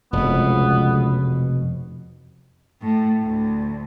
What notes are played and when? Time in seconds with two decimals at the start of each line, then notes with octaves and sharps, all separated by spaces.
0.13 F1 C#2 B2 B3
2.81 A2
3.23 D2